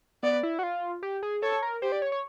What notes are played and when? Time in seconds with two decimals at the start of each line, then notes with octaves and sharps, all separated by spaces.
0.23 B3 D5
0.43 E4
0.59 F#4
0.63 F4
1.03 G4
1.23 G#4
1.43 A4 C#5
1.63 A#4
1.82 G4 C5
1.92 D5
2.02 C#5
2.12 C#5